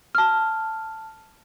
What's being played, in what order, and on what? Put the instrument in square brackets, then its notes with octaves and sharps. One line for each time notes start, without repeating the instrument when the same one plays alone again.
[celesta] A5 F6